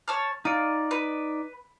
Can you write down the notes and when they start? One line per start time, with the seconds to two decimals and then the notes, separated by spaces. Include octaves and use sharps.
0.08 C#5 A5 F6
0.45 D#4 F4 D5
0.91 B4